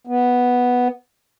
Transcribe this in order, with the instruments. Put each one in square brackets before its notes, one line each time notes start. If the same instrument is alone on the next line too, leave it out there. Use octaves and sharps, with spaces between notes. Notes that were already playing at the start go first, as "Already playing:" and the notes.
[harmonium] B3